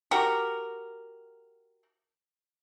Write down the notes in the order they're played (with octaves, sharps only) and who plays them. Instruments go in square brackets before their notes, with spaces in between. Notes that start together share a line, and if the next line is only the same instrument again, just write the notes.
[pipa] F#4 G4 A#4